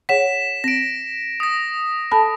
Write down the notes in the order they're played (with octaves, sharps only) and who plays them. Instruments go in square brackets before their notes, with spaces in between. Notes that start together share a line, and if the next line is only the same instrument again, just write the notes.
[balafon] G#4 C#5 F#5 [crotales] B6 E7
[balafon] C4 [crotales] A#6 D7
[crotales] D#6 A#6
[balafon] A4 A5 B5